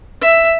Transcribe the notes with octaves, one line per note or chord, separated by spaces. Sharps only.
E5